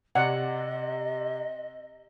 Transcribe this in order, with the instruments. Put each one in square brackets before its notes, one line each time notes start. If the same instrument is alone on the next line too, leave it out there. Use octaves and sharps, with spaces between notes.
[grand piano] C3 D5 [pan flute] D#5 [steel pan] F#5